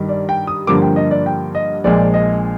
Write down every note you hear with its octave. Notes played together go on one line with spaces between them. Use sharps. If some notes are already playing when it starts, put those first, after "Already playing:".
Already playing: G2 D#3 G3
D5
G5
D#6
G2 D3 F3 A#3 D6
G5
D#5
D5
G5
D#5
A#1 A#2 F3 G#3 D5
D#5